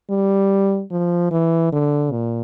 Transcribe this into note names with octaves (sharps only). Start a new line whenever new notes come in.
G3
F3
E3
D3
A#2